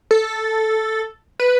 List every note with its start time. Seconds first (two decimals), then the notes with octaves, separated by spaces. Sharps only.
0.11 A4
1.39 B4